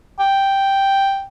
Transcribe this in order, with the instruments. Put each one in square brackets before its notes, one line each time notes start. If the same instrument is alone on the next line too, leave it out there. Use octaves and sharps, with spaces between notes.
[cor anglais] G5